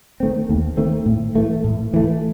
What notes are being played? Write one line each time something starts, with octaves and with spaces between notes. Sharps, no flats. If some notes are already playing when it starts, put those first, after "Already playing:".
D#3 A3 C4
D#2
D#3 A3 C4
A2
E3 A3
A2
E3 A3